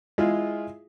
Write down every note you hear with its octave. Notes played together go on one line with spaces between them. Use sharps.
G#3 E4 F4 G#4